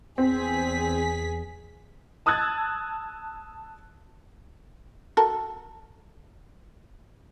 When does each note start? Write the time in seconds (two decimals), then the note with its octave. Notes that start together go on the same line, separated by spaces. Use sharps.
0.18 E2 C4 G#4 B6
2.26 A5 D#6 E6 F#6 G#6 A6
5.17 F#4 A4 A#4